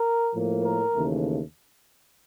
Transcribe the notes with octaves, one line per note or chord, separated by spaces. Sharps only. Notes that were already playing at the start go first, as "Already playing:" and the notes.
Already playing: A#4
A2 F3 A#3
A#4
D#2 C#3 E3 A3